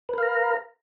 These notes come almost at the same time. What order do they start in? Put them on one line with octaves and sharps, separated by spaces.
B4 A#4 F5 A#5